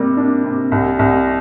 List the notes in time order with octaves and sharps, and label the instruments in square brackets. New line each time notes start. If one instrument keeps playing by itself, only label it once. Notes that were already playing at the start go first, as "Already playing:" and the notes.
Already playing: [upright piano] C3 G3 A#3
D4
C3
C2
C2